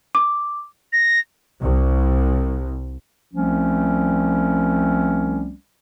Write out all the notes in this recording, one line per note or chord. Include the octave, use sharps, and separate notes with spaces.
D6
A#6
C2
C2 F3 G3 A3 C4 C#4